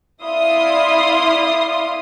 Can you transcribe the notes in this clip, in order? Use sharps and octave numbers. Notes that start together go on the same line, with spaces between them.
E4 D5 E5 F5 C6 D#6